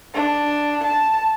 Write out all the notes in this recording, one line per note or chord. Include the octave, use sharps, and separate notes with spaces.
D4
A5